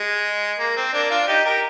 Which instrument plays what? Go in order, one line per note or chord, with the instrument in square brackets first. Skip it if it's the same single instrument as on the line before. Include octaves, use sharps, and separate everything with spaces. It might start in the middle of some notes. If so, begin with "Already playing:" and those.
Already playing: [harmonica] G#3
A#3
C4
A#3 D4
D4 F4
D#4 G4
G4 A#4